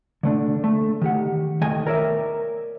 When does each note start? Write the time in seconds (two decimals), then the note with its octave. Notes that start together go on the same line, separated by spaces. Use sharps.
0.23 D3 A3 D4
0.64 A3
1.02 D#3 G4 F#5
1.61 D#2 D#3 A3 D#5 G5 G#5
1.87 A#4 C#5 D5 E5